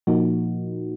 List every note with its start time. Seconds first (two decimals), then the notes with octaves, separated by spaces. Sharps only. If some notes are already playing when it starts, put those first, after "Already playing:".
0.07 A#2 F3 A#3 D#4 F#4